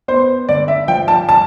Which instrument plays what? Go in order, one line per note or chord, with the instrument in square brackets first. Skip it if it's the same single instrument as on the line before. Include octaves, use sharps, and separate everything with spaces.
[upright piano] B3 C5
D3 D5
E5
F3 G5
A5
A5